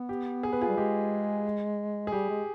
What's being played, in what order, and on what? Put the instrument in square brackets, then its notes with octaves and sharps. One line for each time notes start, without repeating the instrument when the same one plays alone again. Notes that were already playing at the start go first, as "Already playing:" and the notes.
Already playing: [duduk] B3
[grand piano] G4
G#4
B4
F4 G#4
[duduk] G3
[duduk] G#3 [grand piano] G4
[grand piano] G#4
[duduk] G3 [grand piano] G4
[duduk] G#3